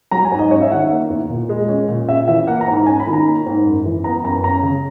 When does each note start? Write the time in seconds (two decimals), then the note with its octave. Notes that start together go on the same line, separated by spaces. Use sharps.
0.11 F#3 A#5
0.25 G#5
0.32 G#2
0.39 D#5
0.51 C#4 C#5
0.62 E5
0.71 D#3 F#5
0.81 E5
0.90 A#3
1.10 E2
1.30 A#2
1.49 G#3
1.69 C#4
1.88 A#2
2.08 C#4 E5
2.28 E3 E5
2.47 A#3 F#5
2.61 A#5
2.68 G#2
2.74 A#5
2.86 C#4 G#5
3.00 B5
3.07 D#3
3.13 A#5
3.26 A#3
3.46 G#2
3.66 F#2
3.86 E3
4.04 B3 A#5
4.24 F#2 A#5
4.44 C#4 A#5
4.63 C#3